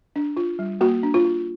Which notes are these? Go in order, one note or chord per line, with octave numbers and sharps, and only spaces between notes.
D4
F4
G3
A#3 F#4
D4
F4
F4